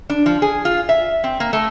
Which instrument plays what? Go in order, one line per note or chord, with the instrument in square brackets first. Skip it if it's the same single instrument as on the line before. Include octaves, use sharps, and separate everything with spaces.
[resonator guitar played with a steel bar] D4
F3
G#4
F4
E5
C4
A#3
A3